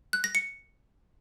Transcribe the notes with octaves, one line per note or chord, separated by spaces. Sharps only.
F#6
A#6
C#7